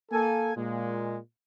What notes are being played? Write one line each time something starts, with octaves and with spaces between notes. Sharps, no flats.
A#3 A4 G#5
A#2 G#3